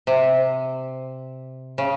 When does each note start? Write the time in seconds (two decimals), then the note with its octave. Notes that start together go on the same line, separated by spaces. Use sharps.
0.07 C3
1.78 C#3